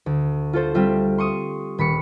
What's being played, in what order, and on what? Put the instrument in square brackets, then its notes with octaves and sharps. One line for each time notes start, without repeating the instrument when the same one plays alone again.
[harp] D2
F4 A4 C5
G3 C4 F4 E5
C6 C#6 D#6
D#1 B5 C#6 C#7